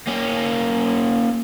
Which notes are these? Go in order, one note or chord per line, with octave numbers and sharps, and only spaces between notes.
A#3 C#4